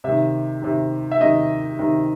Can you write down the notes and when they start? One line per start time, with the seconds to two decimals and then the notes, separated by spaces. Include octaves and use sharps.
0.04 C3 D#3 E5
0.62 C3 D#3
1.11 E5
1.20 C3 D#3 D#5
1.79 C3 D#3